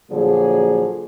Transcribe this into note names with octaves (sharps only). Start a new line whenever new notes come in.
A#2 D3 F3 F#3 G#4 A4